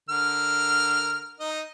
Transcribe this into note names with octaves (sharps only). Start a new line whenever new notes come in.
D3 A#4 F6
D#4 D#5